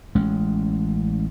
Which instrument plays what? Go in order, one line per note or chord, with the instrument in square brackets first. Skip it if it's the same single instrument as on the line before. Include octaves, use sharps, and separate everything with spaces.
[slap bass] A1 G#3 C#4